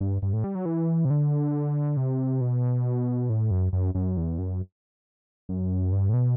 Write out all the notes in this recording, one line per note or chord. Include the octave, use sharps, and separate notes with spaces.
G2
G2
A2
G3
F#3
E3
C3
D3
C3
B2
A2
F#2
F#2
F#2
E2
F#2
F#2
G2
A2
B2